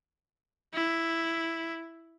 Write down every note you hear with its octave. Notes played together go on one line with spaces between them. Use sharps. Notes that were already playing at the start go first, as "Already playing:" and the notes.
E4